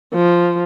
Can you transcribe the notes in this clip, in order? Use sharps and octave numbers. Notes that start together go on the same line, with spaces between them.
F3